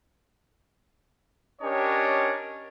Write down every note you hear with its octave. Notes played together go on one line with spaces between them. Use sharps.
C#4 D4 G4 A#4 C#5 D#5